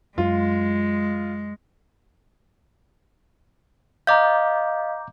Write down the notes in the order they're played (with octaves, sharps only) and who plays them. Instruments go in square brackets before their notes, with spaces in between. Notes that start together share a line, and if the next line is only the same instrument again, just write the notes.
[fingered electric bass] F#2 [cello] G#3 [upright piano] F4
[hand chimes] D#5 F5 [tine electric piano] A#5 D6 G6